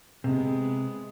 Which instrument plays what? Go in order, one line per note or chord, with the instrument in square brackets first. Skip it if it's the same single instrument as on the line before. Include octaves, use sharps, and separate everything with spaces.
[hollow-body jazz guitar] C3 [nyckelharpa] G#3 B3